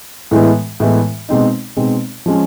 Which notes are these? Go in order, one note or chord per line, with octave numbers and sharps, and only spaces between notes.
A2 E3 G#3 B3
A2 E3 G#3 B3
B2 G#3 C4 D#4
B2 G#3 C4 D#4
F3 G#3 C#4